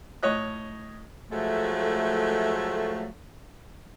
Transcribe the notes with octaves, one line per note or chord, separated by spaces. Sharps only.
A2 C#5 D#5 F#6
F3 F#3 G#3 A3